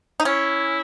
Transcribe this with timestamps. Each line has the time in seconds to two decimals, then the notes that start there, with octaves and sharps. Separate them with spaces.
0.20 D#4
0.25 C#4 E4